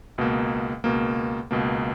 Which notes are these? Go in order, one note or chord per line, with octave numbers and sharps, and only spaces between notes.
C#2 B2 A#3
C#2 B2 A#3
C#2 B2 A#3